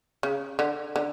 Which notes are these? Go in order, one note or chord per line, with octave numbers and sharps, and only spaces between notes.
C#3
D3
D3